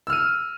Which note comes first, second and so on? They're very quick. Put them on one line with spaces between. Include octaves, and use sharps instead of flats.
E6 F6 D#7